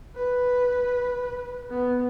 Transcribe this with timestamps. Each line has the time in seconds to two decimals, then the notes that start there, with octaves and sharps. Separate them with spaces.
0.15 B4
1.70 B3